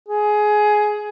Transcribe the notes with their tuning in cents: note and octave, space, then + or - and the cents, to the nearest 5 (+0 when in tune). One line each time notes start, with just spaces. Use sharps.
G#4 +15